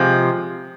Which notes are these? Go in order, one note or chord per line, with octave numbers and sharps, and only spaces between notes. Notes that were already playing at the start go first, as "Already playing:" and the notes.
Already playing: C3 F3 G#3